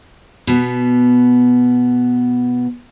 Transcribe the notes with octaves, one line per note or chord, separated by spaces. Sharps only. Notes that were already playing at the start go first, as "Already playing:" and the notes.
B2 B3